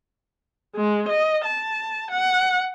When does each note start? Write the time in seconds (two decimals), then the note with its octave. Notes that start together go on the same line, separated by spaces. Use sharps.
0.76 G#3
1.09 D#5
1.45 A5
2.11 F#5